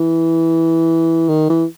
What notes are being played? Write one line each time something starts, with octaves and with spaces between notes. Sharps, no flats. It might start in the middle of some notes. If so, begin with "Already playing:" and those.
Already playing: E3
D#3
E3